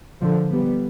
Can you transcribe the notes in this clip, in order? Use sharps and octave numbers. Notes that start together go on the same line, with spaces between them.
D3 F3
G3 B3